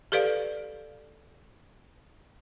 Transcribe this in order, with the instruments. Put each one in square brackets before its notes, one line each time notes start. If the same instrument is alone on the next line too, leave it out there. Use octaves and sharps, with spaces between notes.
[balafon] G4 A4 B4 D5 F5